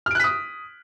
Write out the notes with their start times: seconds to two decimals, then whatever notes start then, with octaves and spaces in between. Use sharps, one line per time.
0.06 F6
0.11 D7
0.15 F#6
0.20 B6
0.24 D#6